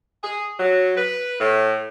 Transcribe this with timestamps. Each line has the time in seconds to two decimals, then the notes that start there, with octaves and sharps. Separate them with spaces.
0.23 G#4
0.59 F#3
0.97 B4
1.40 A2